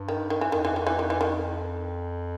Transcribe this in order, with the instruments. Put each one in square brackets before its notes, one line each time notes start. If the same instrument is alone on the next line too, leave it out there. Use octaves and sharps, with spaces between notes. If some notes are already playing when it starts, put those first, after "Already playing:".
Already playing: [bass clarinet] G2
[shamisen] D#3
D#3
E3
[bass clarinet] F2 [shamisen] D#3
[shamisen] E3
D#3
E3
D#3
E3
D#3